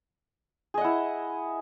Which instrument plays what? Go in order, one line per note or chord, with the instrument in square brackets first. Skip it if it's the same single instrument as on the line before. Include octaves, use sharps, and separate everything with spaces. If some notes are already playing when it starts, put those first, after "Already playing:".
[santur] G#4
D#5
F#5
E4